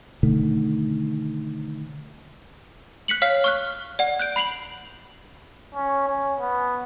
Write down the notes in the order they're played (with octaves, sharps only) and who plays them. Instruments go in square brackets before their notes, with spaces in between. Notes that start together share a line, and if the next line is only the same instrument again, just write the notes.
[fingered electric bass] B2 D3 D#3 A3
[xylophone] F#6 B6 C#7 F#7
C#5 F5 F6 B6 C7
C#6 F6 F#6
D5 F#5
F#6 G6 D7
B5 C7 F7 F#7
[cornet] C#4
C#4
B3